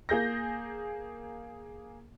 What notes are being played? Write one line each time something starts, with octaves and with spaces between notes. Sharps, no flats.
A#3 G#4 G6 A#6